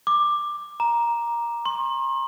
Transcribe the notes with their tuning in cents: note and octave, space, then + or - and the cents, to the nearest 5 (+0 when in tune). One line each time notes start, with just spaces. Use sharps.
D6 +10
A#5 +10
C6 +40